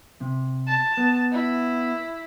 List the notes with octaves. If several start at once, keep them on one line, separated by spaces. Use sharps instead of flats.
C3
A5
B3
E4